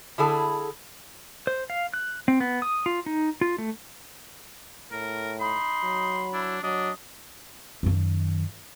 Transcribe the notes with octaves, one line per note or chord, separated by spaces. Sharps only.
D3 E4 G#4 A4 A5
C5
F5
F#6
C4
B3
D#6
F4
D#4
F4
A3
A2 A#4
D#4 B5 C6
F#3
D4 E4
F#3 D4 D#5
F#2 D#3